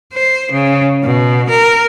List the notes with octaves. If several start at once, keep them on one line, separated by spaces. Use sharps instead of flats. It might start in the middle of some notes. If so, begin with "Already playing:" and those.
C5
C#3
B2
A#4